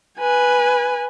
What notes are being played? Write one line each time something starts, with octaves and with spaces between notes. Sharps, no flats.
B4 G#5